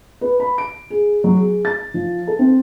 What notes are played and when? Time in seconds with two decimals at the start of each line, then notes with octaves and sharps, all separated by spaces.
0.21 B4
0.40 B5
0.58 D7
0.90 G#4
1.24 F#3
1.37 G#4
1.65 A6
1.94 F3
2.27 A4
2.39 C4